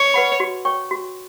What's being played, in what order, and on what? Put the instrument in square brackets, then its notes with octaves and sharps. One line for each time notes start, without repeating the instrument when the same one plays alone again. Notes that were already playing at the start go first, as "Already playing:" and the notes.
Already playing: [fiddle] C#5
[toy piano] B4 F#5 B5
F#4
C#5 G5 C#6
F#4